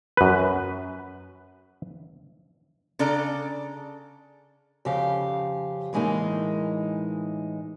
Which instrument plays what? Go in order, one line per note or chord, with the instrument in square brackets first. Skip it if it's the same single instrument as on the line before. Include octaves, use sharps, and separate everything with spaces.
[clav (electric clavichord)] F#2 B4
[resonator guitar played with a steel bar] C#3 D4 A4 D5 A#5
[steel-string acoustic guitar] F2 C#3 G4 F5
A2 E3 G#3 A#3 D#4